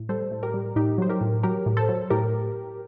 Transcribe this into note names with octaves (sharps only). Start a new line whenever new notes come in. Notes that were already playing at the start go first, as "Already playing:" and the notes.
Already playing: A2
G3 A4 C5
A2
G4 A#4
G3
A2 D#4 G4
F#3 C5
G4 A#4
A2
F#3 G4 A#4
A2
A4 C5
F#3
A2 G4 A#4